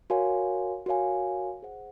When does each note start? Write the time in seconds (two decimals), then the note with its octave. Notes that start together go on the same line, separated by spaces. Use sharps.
0.10 F#4 A#4 C#5 F5 G#5
0.86 F#4 A#4 C#5 F5 G#5
1.62 G#4 C5 F#5